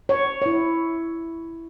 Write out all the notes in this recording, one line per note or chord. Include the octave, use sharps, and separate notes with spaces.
C#5
E4 C#5